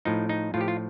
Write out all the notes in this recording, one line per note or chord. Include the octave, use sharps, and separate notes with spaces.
A2 F3 D#4
D#4
A2 F3 F4 G4
F4